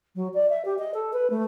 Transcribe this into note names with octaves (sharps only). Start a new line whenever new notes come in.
F#3
D5
E5
G4
D#5
A4
B4
A3